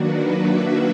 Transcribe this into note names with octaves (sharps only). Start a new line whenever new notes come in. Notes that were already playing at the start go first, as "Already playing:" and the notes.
Already playing: D#3 F#3 A#3 D4 F#4 B4
E5